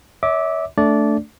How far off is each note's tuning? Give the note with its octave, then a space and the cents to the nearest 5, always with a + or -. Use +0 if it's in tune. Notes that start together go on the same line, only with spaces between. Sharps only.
C#5 +30 E5 -30 D6 +0
A3 +0 D4 -15 D5 -15